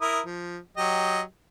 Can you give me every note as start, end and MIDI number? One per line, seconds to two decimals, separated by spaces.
0.01 0.20 64
0.01 0.20 70
0.01 0.20 87
0.26 0.58 53
0.77 1.21 54
0.77 1.21 67
0.77 1.21 75